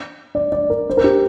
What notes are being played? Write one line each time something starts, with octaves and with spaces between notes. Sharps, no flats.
D5
D5
A#4
C5
A#4
G4